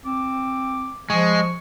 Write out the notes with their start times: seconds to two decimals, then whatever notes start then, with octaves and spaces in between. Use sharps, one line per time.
0.06 C4 D6
1.10 F3 G#3 C#6